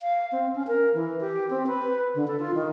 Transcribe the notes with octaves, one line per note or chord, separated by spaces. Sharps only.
F5
C4
C#4
A#4
E3
G4
C4
B4
D3
A4
F4
D#3